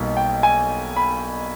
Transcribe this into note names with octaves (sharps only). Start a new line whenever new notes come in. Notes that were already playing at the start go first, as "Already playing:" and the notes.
Already playing: B1 B2 G3 A#3 D#4
G5
G#5
B5